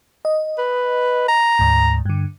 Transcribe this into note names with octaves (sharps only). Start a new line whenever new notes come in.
D#5
B4
A#5
D2 G#2
G2 D3